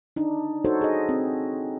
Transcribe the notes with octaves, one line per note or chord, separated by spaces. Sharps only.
D4 D#4
D#4 F#4 A4 C5 C#5
G#4 D#5
C4